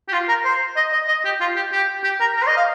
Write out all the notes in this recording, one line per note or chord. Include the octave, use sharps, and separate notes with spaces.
G4
F4
A#4
C5
D#5
D#5
D#5
G4
F4
G4
G4
G4
A#4
A#4
C5
D#5
F5